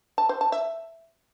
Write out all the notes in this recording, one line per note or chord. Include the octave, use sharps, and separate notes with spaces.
A5
C5
A5
E5